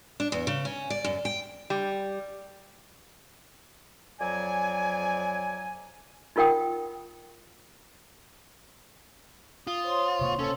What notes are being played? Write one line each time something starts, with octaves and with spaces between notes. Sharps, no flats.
D4
E2
C#3
C#4
D5
F#2
G5
G3
F2 F#3 D5 G#5
D#4 F4 A#4 F#5 G5 D#6
F4 D#6
C5 C#5 C6
C3 A#3 C#6
C#4 A4